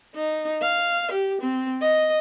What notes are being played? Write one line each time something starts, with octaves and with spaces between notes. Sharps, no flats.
D#4
F5
G4
C4
D#5